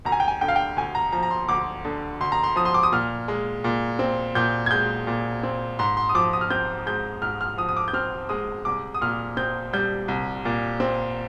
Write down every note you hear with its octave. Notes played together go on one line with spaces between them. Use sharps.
D2 A#5
G#5
G5
G#5
D3 G5
F5
G5
D2 G#5
A#5
F3 A#5
A#5
C6
D2 D6
D3
D2 C6
A#5
C6
F3 D#6
C6
D6
D#6
A#2 F6
G#3
A#2
C4
A#2 G6
G#6
G#3 G6
A#2
C4
G#2 C6
C6
D#6
F3 D6
D#6
F6
C4 G6
G#3 G6
G#2 F6
F6
F3 D#6
D#6
D6
G6
C4 F6
G#3 D#6
C2 D6
D#6
A#2 F6
C4 G6
G3 G6
C2
A#2
C4